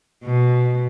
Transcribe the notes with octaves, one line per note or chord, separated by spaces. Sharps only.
B2